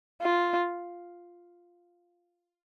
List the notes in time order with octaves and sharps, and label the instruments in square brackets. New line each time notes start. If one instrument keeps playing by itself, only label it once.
[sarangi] F4